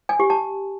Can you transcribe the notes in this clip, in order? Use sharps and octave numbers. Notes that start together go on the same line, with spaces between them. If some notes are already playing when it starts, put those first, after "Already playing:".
G#5
G4
A5